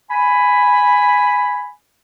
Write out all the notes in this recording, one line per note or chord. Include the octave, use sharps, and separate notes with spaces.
G#5 B5